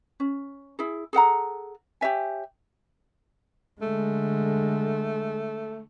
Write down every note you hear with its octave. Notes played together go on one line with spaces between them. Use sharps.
C#4
E4 G#4
G#4 A4 F#5 A#5
G4 C#5 E5 G#5
D3 G#3 A3